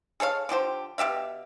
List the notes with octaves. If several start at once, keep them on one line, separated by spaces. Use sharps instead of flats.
G#4 A4 C#5 F5
D3 F3 G4 C5
B2 G4 E5 F5